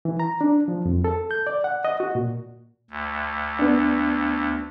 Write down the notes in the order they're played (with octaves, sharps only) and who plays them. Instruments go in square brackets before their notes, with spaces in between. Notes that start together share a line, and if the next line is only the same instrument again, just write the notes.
[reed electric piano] E3
A#5
D4
F3
F2
A4
G6
D5
F#5
D#5
F#4
A#2
[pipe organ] D2
[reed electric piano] B3 D4